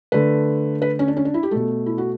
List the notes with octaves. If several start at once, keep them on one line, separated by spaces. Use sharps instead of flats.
D3 A3 B4
B4
C#4
D4
C#4
D4
E4
G4
B2 A3 A4
E4
F#4